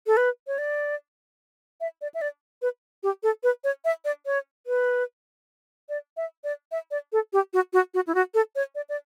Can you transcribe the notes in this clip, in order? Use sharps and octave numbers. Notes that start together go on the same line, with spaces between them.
A4
B4
C#5
D5
E5
D5
E5
D5
B4
G4
A4
B4
C#5
E5
D5
C#5
B4
D5
E5
D5
E5
D5
A4
G4
F#4
F#4
F#4
E4
F#4
A4
C#5
D5
D5